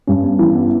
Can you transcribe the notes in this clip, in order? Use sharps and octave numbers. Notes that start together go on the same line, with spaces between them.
G2 C#4
B3
E3
B3